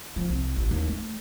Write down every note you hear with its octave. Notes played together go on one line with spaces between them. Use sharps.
F3
C2
A1
D#2
A3